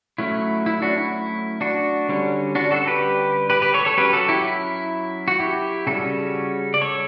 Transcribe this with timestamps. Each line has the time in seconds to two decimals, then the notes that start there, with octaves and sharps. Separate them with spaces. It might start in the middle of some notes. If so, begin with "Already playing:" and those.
0.18 F#3 A3 C#4 E4
0.66 E4
0.82 D4 F#4
0.98 E4
1.61 D4 F#4
2.09 D3 G3 C#4
2.55 D4 F#4
2.71 F#4 A4
2.87 G4 B4
3.50 G4 B4
3.62 G4 B4
3.74 A4 C#5
3.85 A4 C#5
3.98 F#3 C#4 G4 B4
4.13 F#4 A4
4.29 E4 G4
4.44 E4
5.28 F#4
5.40 E4 G4
5.87 C#3 G3 C#4 F#4 A4
6.74 D5
6.81 A4 C#5